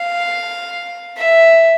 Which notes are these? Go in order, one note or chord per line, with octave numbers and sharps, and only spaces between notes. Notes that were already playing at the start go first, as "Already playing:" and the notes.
Already playing: F5
E5